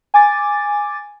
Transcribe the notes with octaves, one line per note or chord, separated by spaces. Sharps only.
G#5 D6 A6